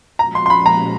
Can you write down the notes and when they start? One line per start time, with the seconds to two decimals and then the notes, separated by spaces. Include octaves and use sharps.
0.19 A#2 F3 G#3 C#4 F#4 A#5
0.35 C6
0.46 C6
0.50 B5
0.66 A#5